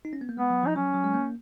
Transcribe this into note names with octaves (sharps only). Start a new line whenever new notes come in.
D#4
C#4
B3
A#3
G#3 B3
F#3
F3 D#4
F#3 C#4
F#3
G#3
A#3